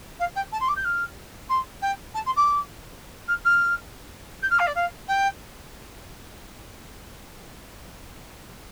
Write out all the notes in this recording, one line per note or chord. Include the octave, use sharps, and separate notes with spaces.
F5
G5
A5
C6
D6
G6
F6
C6
G5
A5
C6
D6
F6
F6
G6
F6
F5
D5
F5
G5